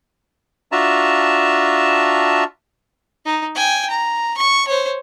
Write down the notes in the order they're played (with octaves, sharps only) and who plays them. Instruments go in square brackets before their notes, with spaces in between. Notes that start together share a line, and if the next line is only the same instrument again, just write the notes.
[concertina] D4 F4 F#4 E5 A5 A#5
[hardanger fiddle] D#4
G5 G#5
A#5
C#6
C5 C#5